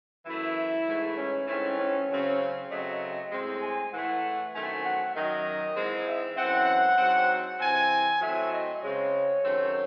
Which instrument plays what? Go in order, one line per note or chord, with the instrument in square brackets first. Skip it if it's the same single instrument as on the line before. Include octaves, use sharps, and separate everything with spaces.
[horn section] F#2 E3 A3 E4
G#2 E3 A3
C#4
G#2 E3 A3 C4 C#4
C#4
C#3 F#3 C4 C#4
C#3 F#3 A3 C4 D#5
A2 G#3 C4
G#5
A2 E3 A3 F#5
F#2 D#3 A3 C4 G#5
F#5
F#2 D#3 F#3 D#5
G#2 E3 G#3 C4
E5
F#2 E3 C4 F#5
G#2 F#3 C4
C3 E3 C4 G#5
A2 F#3 A3 C4 E5
D#5
C#3 G#3 C4 C#5
F#2 D#3 A3 C4